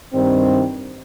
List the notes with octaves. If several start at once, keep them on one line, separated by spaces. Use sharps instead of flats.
G2 D#3 G3 C4